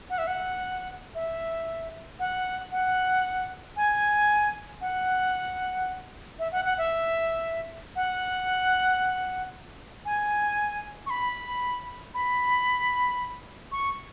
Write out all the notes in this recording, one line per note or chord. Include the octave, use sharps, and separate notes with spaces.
F#5
E5
F#5
E5
F#5
F#5
G#5
F#5
E5
F#5
F#5
E5
F#5
G#5
C#6
B5
B5
C#6